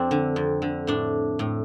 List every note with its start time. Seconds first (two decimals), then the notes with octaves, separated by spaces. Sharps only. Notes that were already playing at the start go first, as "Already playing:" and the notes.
Already playing: F2 C4 D4
0.11 D3
0.36 F2
0.62 D3
0.87 A2 D4
1.39 A2